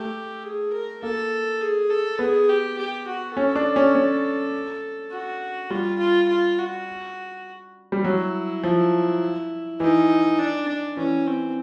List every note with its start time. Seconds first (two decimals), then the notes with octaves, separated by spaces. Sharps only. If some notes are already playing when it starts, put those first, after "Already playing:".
Already playing: A3 G4
0.44 G#4
0.73 A#4
1.03 A#3 A4
1.61 G#4
1.90 A4
2.19 B3 G#4
2.49 G4
2.78 G4
3.07 F#4
3.37 C#4 A4
3.56 D4
3.76 C#4
3.95 C#4
5.12 F#4
5.70 G3 F4
6.00 F4
6.29 F4
6.59 F#4
7.92 G3
8.04 F#3 E4
8.64 F3
9.80 E3 D#4
10.39 D4
10.68 D4
10.97 E3 C#4
11.27 C4